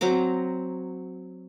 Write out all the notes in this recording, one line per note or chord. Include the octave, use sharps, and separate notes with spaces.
F#3 C4 A#5 D6